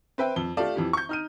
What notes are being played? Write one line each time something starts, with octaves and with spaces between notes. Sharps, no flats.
C4 B4 E5 G5
F2 G7
A3 F4 G4 D5 A5
F2 E3 G4
C#6 G6
D#4 F6 D#7